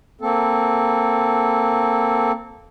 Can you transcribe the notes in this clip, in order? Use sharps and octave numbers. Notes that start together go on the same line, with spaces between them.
A#3 C4 A4